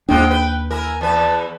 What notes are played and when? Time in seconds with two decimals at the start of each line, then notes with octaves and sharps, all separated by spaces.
0.09 D#2 G#2 G#3 D4 F4 G5
0.31 B4
0.70 E4 A#4 G#5
1.01 E2 B4 A5